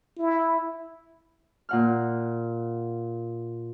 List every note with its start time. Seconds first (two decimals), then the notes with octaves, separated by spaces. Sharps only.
0.18 E4
1.69 A#2 F#5 F6